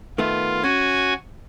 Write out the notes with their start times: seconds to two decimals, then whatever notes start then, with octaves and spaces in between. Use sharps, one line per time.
0.18 D#3 A3 B3 F4
0.63 C#4 F#4 G#5